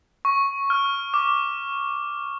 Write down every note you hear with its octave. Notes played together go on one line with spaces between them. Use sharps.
C#6
F6
D6